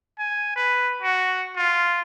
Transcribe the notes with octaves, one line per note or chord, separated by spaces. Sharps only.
G#5
B4
F#4
F4